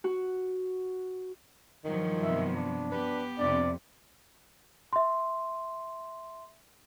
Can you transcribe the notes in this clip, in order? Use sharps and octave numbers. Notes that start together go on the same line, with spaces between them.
F#4
G2 D#3 F3 F#3
C3 B3 E5
D4
B3 G4 B4
F2 C3 D4 D5
E5 C6